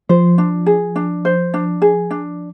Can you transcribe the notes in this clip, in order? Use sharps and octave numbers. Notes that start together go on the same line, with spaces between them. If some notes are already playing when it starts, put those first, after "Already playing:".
F3 C5
D4
G#4
D4
C5
D4
G#4
D4